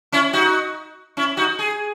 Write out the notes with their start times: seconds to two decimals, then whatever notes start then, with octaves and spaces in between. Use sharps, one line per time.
0.12 C#4 E4
0.33 D#4 F#4
1.17 C#4 E4
1.37 D#4 F#4
1.59 G#4